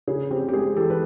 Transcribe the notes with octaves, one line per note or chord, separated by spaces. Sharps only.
C#3 G#4
C4 G4
G4
G#3 G#4
E3 G4 A4
B4